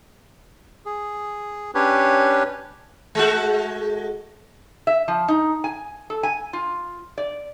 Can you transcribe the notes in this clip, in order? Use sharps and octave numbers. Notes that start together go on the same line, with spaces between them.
G#4
C#4 D4 G4 B4 C#5
G#3 A3 F#4
E5
F3
D#4
G#5
A4
G#5
F4
D5